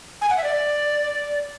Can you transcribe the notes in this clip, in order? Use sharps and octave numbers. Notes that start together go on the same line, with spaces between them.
G#5
F#5
E5
D5